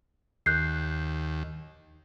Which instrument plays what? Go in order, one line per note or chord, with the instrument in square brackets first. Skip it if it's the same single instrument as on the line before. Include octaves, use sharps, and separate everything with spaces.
[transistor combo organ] D#2 [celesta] F#6 G6 C7